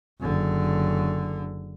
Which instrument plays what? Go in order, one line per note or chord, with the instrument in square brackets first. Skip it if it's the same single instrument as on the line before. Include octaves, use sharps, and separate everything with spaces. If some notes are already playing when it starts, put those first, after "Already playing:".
[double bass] F#1 D3